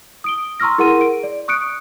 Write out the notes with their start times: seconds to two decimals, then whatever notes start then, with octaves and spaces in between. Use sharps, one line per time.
0.24 D#6 D7 G7
0.60 A#5 C6 C#6 E6 F6 A#6
0.78 E4 G#4 A#4 F#5 C6 D#7
1.01 D7
1.23 D5
1.48 C#6 D#6 F#6 C#7 D7